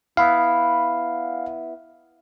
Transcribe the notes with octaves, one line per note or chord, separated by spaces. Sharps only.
B3 E4 F5